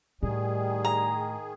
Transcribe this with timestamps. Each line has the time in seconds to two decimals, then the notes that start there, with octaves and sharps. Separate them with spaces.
0.23 A2 D#3 G3 G#4
0.85 A#5